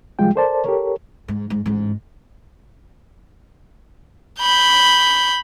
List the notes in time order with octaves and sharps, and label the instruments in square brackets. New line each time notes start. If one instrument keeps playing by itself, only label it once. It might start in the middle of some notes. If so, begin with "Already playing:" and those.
[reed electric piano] C2 F3 G3 G#3 F4 G5
A4 A#4 C5 D5 A5
G4 A4 A#4 C#5
[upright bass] G#2
G#2
A1 G#2
[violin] B5 G6